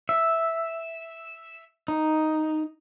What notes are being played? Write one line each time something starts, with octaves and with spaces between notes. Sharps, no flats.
E5
D#4